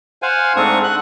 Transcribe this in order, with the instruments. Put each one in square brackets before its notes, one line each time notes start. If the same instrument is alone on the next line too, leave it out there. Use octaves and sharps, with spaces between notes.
[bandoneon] C5 F5 F#5 G#5
G#2 A3 C4 D4 C#6 D#6
F#5 F#6